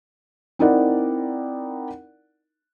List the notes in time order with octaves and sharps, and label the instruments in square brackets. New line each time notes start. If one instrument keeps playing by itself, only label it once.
[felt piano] C4 D#4 E4 A#4 D5 F#5